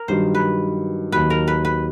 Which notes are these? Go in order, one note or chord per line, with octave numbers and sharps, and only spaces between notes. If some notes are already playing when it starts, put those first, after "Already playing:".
Already playing: A#4
G2 D#3 F#3 C5
B4
D#2 D#3 F#3 B4
A#4
B4
B4